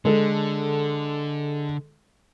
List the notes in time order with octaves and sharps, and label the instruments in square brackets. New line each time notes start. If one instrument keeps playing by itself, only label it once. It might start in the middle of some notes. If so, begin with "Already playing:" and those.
[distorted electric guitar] D3 [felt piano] G#3 A4